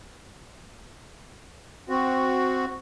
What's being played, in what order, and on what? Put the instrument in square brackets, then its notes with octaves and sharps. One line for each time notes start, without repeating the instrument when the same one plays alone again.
[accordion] C4 F#4